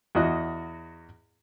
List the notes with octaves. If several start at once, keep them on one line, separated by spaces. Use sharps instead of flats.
E2 F#4 D#5 F#6